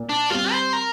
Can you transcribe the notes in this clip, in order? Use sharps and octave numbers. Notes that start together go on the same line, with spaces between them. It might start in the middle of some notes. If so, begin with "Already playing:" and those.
Already playing: A#2
D4
G3 C4 F4
C5
A#4